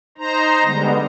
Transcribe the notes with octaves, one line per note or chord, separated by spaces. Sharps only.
D#4 C5 A#5
D3 G3 G#3 B3